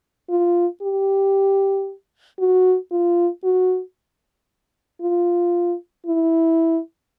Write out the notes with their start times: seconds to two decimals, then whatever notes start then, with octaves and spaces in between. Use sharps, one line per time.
0.30 F4
0.82 G4
2.39 F#4
2.91 F4
3.44 F#4
5.01 F4
6.06 E4